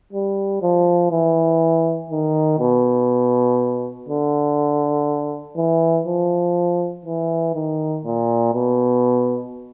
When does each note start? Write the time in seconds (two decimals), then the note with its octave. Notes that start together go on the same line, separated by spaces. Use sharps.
0.13 G3
0.62 F3
1.11 E3
2.10 D#3
2.60 B2
4.09 D3
5.56 E3
6.07 F3
7.05 E3
7.54 D#3
8.05 A#2
8.54 B2